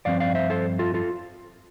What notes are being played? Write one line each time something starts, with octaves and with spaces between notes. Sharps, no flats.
G2 F3 C4 D5 F5
D5 F5
C5 E5
A4 C5
F4 A4
F4 A4